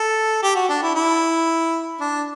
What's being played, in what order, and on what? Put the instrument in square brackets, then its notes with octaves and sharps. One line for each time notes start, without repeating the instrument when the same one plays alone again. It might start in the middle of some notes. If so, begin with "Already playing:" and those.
Already playing: [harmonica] A4
G4
F#4
D4
E4
E4
D4